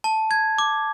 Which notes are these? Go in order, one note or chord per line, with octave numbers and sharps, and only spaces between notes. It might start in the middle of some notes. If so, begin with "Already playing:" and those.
A5
G#6
D6